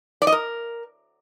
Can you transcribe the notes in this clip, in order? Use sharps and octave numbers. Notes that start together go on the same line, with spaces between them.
D5
D#5
A#4